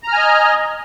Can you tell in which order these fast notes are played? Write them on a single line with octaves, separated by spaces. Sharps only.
A#5 F6 G#5 D#5